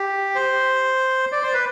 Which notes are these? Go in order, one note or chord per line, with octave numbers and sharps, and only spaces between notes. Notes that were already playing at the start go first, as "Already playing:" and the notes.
Already playing: G4
C5
D5
C5
B4